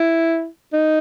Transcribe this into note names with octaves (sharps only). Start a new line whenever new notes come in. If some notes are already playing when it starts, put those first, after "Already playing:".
Already playing: E4
D#4